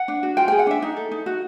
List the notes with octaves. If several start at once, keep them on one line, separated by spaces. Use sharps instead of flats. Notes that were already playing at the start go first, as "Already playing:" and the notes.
Already playing: F#5
D4
F#4
F4 G5
G#4 G5
F#5
D4 E5
D#4
A4
D#4
F#4